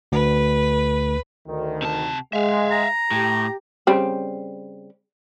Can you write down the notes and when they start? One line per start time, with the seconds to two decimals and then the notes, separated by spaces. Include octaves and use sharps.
0.12 D2 B4
1.47 D2 D#3
1.82 C3 A5
2.33 G#3 E5 F5
2.71 A#5
3.11 A2 G4
3.87 C#3 G3 C4